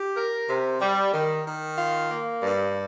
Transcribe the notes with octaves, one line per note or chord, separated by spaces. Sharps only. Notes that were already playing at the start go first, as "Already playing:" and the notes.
Already playing: G4
A#4
C3
G3
D#3
D#3
F4
A#3
G2